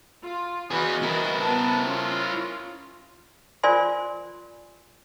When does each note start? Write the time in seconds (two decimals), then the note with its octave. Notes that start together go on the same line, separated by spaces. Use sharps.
0.21 F4
0.71 E3 F#4 G#4 B4 D#5
1.03 E4 A#4
1.39 B3 B4 A5
1.83 C#4 F4
3.63 F4 A#4 C5 D5 G#5 C6